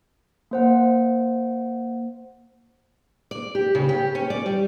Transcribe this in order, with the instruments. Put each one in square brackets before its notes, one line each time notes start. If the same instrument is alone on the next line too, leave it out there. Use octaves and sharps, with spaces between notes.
[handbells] A#3 C5 F#5
[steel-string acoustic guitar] D5
G4
C#3
G4
C#4
D5
G3